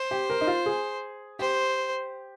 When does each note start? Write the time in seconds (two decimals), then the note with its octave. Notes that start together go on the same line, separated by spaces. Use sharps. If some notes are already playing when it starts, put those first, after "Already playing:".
Already playing: C5
0.11 G4
0.30 A#4
0.41 D#4
0.47 F4
0.66 G#4
1.39 G4 C5